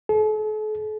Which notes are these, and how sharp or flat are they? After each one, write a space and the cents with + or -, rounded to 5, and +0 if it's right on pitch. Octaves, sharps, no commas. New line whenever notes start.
A4 -45